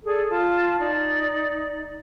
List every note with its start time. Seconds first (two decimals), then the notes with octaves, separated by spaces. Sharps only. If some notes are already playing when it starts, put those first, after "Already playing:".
0.04 G#4 A4 D5
0.28 F4 A5
0.77 D#4 D5